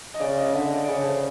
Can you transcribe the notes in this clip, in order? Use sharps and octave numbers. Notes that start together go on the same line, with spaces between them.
D#5
C#3 D5
D#5
D3 E5
D5
D5
C#3 C#5
C5